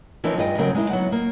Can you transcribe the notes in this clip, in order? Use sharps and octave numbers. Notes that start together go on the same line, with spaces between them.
E3 F3 C4 D#4 A#4 C#5
G2 F4 G#4 B4 D#5 G5
C#3 F#3 C4 A#4 G5
G#3 D#4 E4
F#3 B3 F#5
A#3